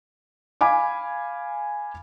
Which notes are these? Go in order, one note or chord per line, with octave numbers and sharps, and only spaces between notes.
F5 G#5 B5 D6